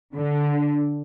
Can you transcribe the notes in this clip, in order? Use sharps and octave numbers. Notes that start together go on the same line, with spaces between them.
D3